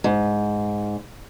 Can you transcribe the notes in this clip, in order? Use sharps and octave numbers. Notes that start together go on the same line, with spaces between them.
G#2